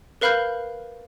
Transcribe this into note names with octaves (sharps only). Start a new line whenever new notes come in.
A#4 B4 F5 B5 F6 G6